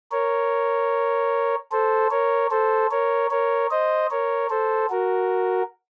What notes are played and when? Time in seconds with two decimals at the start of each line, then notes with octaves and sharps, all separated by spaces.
0.11 A#4 C#5
1.71 A4 C5
2.11 A#4 C#5
2.51 A4 C5
2.91 A#4 C#5
3.31 A#4 C#5
3.71 C5 D#5
4.11 A#4 C#5
4.50 A4 C5
4.90 F#4 A#4